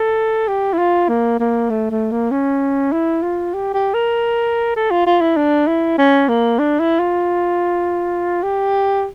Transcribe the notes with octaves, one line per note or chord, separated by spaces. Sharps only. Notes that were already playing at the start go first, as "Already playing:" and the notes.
Already playing: A4
G4
E4
F4
A#3
A#3
A3
A3
A#3
C#4
E4
F4
G4
G4
A#4
A4
F4
F4
E4
D4
E4
C#4
A#3
D4
E4
F4
G4